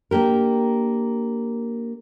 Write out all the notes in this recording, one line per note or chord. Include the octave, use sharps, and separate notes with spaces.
A#3 D4 G4 A#4